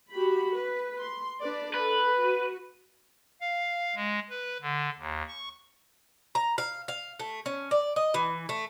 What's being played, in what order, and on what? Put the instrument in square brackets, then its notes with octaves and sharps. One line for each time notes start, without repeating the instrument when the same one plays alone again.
[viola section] F#4 G4 B5
B4
C6
D4 B4 D5
[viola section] A4 [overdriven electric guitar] B4
[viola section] F#4
[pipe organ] F5
G#3
B4
D3
D#2
C#6
[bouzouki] A#5
F5
F5
A3
C#4
D5
D#5
E3
A3